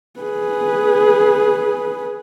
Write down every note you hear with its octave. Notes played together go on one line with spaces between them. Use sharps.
G#4 B4